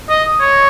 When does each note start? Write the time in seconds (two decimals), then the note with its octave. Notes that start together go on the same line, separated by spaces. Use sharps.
0.09 D#5
0.41 C#5